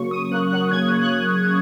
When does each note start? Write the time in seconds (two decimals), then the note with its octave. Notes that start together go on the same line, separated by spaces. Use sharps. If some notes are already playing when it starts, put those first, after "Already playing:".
Already playing: C#3 F#3 A#3 C#6
0.11 C#3 D#6
0.31 A#3 F#6
0.51 F#3 F#6
0.71 C#3 G#6
0.91 C#3
1.01 F#6